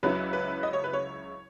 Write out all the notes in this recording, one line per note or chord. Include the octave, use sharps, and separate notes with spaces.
C#2 C#3 F#3 C#4 E4 B4
B4
D#5
C#5
B4
C#5